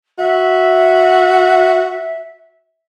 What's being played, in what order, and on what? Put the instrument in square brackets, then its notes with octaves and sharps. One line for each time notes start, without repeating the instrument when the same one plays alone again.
[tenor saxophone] F#4 [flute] E5